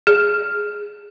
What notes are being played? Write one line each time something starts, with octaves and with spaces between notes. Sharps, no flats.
G#4